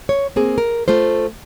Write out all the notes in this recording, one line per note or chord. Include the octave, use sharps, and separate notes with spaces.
C#5
A#3 C4 G#4
A#4
A3 F4 C5